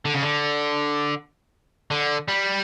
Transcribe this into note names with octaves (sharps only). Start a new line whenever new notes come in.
D3
C#3
D3
D3
G3